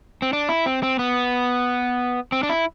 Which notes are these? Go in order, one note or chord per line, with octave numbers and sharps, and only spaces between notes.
C4
D4
E4
C4
C4
B3
C4
D4
E4